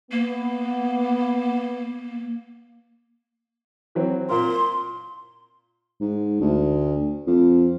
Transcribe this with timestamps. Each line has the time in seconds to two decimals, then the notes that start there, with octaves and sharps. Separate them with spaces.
0.12 A#3 B3
3.95 E3 F#3 C4
4.30 A#2 A#4 C6
6.00 G#2
6.41 D2
7.27 F2